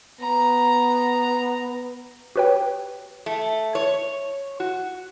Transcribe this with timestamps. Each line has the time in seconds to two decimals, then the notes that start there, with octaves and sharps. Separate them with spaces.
0.21 B3 A#5
2.36 F#4 G4 B4 C#5 G5
3.26 A3
3.75 C#5
4.60 F#4